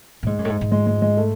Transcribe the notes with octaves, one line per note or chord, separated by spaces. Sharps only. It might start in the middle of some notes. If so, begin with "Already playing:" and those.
A2
G#2 G#3
F#2
A2
G#2
G#2
G#3
G#3
G#3
A3